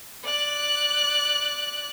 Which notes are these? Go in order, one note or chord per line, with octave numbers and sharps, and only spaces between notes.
D5 F#6